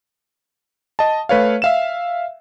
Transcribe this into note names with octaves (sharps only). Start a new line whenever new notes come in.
D#5 A5
A3 B4 C#5 F5
E5 F5 E7